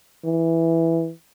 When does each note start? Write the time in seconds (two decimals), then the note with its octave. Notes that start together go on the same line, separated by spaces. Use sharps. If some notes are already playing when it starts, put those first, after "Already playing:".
0.25 E3